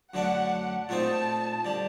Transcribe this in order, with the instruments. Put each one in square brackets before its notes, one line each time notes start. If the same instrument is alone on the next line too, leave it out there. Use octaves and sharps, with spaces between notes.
[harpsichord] F#2 D3 A3 D4 [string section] F#5
[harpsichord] A#2 A3 C4 D#4 [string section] A5
[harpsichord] D3 G3